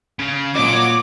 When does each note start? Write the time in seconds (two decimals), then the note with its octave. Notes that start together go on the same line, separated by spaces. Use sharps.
0.19 C#3
0.56 A#2 F#4 C#5 D#5 D6